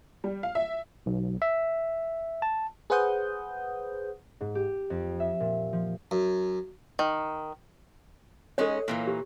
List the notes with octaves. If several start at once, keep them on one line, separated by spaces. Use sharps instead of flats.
G3
F5
E5
B1
E5
A5
G#4 B4 C5 F#5 D#6 G6
G#2
G4
F2
E5
A#2
F3
F#2
D#3
G#3 C#4 D#4 A4 C#5
A#2 E3 A#3
G4